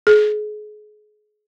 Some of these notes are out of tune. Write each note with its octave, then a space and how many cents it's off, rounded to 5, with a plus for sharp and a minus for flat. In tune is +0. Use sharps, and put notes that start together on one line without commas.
G#4 +35